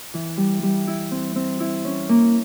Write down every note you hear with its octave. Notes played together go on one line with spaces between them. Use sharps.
E3
G3
G3
E4
C4
C4
E4
C#4
A#3